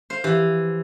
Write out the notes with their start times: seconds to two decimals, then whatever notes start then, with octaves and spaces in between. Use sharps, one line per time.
0.10 C5 F5
0.24 E3 F3 G4